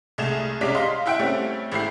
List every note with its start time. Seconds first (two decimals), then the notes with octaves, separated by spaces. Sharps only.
0.18 C2 G#3 A3 G#4 E7 F7
0.61 C2 C3 G#3 C#4 D5 B6
0.75 D#5 F5 C6
1.06 E4 E5 F#5 G5 D7
1.19 G3 A3 C4 C#4
1.72 G#1 A3 E4 G4 C7